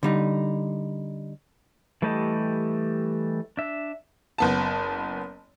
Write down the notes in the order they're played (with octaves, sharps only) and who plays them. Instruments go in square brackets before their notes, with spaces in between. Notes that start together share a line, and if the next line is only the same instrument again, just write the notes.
[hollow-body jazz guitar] D3 G3 D#4
[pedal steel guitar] E3 G3 A3 G4 D#5
D4 E5
[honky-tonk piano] F#1 B3 A5